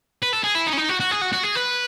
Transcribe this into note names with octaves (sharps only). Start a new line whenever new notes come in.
B4
A4
G#4
E4
D#4
C#4
D#4
F#4
F#4
G#4
F#4
F#4
G#4
B4